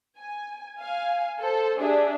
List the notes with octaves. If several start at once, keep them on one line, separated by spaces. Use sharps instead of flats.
G#5
F5 G#5
A4 C5
D4 G4 G#4 E5